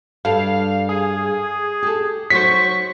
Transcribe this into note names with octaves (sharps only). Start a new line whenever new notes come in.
G2 D4 A4 F5
G#4
G4 A4
F#3 D#4 C5 C#6 B6